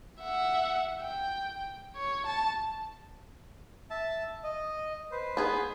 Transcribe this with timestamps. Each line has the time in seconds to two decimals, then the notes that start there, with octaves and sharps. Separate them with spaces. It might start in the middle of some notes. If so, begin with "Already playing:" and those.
0.21 E5 F#5
1.02 G5
1.96 C#5
2.26 A5
3.90 E5 A5
4.44 D#5
5.12 B4 C5
5.37 B3 G#4